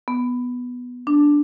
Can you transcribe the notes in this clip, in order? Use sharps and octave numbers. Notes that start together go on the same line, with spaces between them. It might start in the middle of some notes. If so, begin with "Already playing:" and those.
B3
D4